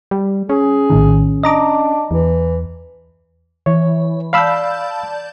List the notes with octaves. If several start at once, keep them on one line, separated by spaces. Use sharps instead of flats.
G3
C#4 G#4
A#1 A2 D#3
D4 D#5 A#5 D6
E2 E3
E3 C#5
D5 F5 A5 B5 E6 G6